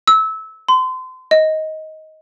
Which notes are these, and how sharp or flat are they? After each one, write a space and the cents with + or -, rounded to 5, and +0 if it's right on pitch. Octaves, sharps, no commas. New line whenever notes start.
E6 -20
C6 -30
D#5 +15